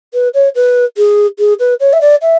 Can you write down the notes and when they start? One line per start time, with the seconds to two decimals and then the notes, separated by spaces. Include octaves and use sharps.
0.13 B4
0.34 C#5
0.55 B4
0.97 G#4
1.39 G#4
1.59 B4
1.80 C#5
1.93 E5
2.01 D5
2.22 E5